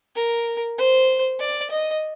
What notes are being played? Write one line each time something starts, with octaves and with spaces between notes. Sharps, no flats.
A#4
C5
D5
D#5